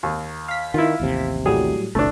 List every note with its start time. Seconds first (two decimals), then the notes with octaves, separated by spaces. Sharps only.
0.03 D#2
0.48 F5 B6
0.74 D#3 E4 F4
1.00 A1 D#2 C3
1.46 A2 F#3 G3 G#4
1.95 G1 C2 A3 D4